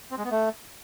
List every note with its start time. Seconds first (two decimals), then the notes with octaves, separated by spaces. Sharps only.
0.11 C4
0.18 G#3
0.24 B3
0.31 A3